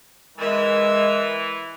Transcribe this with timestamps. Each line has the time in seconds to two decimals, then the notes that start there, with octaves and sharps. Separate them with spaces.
0.38 E3 G#3 A#4 E5